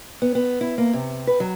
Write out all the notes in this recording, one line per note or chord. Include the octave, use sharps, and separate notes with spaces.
B3
B3
E4
A#3
C3
B4
F#3